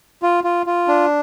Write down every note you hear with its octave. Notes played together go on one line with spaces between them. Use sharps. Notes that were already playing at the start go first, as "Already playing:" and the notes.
F4
F4
F4
D4